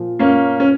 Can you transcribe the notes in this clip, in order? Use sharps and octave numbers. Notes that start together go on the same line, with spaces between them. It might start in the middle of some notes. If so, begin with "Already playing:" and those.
Already playing: A#2 F3
A#3 C#4
C#4